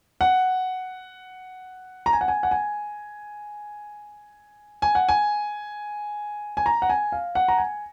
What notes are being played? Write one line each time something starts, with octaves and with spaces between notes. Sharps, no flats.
F#5
A#5
G#5
F#5
G#5
F#5
G#5
G#5
F#5
G#5
G#5
A#5
F#5
G#5
F5
F#5
A#5
G#5